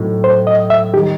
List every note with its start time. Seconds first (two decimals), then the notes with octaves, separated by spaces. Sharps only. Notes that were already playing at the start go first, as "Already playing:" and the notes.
Already playing: A2 F#3 C4 D#4
0.24 C5
0.47 D#5
0.70 E5
0.94 D#3 G3 D#4 G4